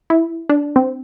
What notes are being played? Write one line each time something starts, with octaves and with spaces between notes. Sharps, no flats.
E4
D4
C4